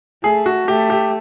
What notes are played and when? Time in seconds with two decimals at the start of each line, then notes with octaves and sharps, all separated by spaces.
0.24 A3 G#4
0.46 F#4
0.67 A3 G4
0.90 G4